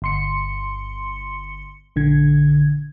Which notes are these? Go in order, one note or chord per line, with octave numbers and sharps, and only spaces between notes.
G1 C6 C#7
A#1 D3 G#6